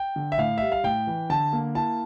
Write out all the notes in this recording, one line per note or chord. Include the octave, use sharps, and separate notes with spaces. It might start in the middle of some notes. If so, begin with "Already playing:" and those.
Already playing: G5
D3
E5
A2 F5
G3 E5
F5
A2 G5
E3
D3 A5
A#3
E4 A5